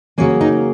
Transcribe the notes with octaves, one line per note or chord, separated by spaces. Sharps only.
C#3 F#3 A#3 C#4
D#4